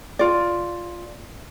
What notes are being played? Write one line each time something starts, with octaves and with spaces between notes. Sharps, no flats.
F4 D5